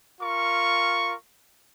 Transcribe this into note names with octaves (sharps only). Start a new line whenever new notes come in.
F4 A#4 C#6